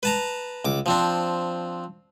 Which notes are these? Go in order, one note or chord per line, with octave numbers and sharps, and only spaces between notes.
B4 A5 A#5
C#2 D6
F3 C4 D4